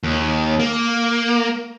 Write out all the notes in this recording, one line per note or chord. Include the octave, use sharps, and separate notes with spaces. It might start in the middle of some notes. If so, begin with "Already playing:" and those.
D#2
A#3